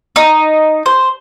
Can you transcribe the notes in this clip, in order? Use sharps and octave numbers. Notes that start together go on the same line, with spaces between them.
D#4
C5